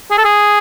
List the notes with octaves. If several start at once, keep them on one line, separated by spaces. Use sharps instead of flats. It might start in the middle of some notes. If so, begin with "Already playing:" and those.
G#4
A4
G#4